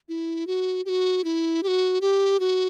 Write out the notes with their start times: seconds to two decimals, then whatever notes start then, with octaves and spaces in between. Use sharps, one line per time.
0.09 E4
0.47 F#4
0.86 G4
0.89 F#4
1.24 E4
1.63 G4
1.68 F#4
2.01 G4
2.40 F#4